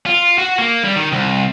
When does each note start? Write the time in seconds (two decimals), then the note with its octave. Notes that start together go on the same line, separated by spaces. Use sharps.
0.06 F4
0.38 F#4
0.59 A#3
0.84 G3
0.96 D#3
1.12 C2